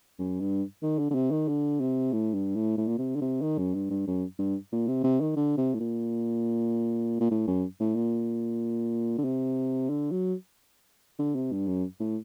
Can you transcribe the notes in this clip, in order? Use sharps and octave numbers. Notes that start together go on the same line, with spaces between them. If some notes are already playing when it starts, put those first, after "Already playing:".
F#2
G2
D#3
D3
D3
C3
D#3
D3
C3
A2
G2
A2
A2
A#2
C3
D3
C3
D#3
F#2
G2
G2
F#2
G2
A#2
C3
C3
D#3
D3
C3
A2
A#2
A#2
A2
F#2
A2
A#2
D3
C3
D3
F#3
D3
C3
G2
F#2
A2